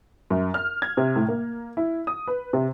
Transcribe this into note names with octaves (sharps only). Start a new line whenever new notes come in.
F#2
F6
G#6
C3
A2
A#3
E4
D#6
B4
C3